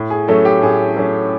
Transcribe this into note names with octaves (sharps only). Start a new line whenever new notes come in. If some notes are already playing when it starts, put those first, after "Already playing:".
Already playing: A2
G#4
F#3 A3 C#4 A4
G4
A2 G#4
F#3 A3 C#4